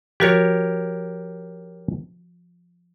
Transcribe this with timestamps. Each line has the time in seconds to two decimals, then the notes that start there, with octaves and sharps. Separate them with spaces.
0.20 F3 F#4 G4 A#4 C#5 A6